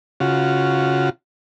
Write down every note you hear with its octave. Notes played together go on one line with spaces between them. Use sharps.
C#3 F4 F#4